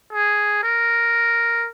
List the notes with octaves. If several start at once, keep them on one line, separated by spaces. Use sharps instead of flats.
G#4
A#4